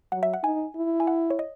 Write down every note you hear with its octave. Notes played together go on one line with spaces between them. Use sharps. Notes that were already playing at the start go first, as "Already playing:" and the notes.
F#3 F#5
E5
F#5
D#4 G#5
E4
G#5
F#5
C#5
D#5